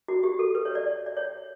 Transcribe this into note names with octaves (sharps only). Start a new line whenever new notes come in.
F#4
G4
A4
B4
C#5
D5
D5
C#5